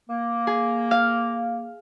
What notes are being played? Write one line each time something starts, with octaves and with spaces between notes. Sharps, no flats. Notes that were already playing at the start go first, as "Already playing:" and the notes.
A#3
G#4
F5